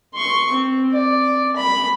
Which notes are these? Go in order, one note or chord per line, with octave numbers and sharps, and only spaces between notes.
C6 C#6
C4
D5
B5